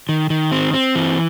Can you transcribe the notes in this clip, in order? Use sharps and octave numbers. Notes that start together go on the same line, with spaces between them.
D#3
D#3
C4
C4
E3